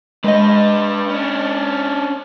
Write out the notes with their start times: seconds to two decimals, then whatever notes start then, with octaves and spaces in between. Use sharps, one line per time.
0.24 G#3 D4 B4 D#5
1.10 C#4 D4